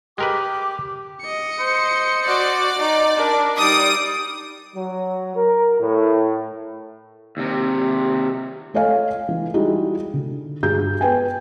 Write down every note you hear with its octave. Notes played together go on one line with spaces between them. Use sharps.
G#3 G4 A#4 B4 D6
D#5 C#7
C5
F#4 D5
D#4
D4 A#4 D6
G3 D#4 D5 D#6 D7
F#3
A#4
A2
D#2 C3
A3 A4 C#5 D#5 F5 G#5
E3
G3 G#3 D#4 E4 F#4
D3
G2 F#4 G#4 G6
B3 B4 G5 G#5